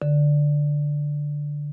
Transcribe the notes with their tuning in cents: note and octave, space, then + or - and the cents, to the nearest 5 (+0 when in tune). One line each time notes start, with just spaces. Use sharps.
D3 +0